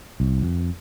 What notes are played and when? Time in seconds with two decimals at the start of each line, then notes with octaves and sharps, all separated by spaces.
0.20 C2
0.42 F2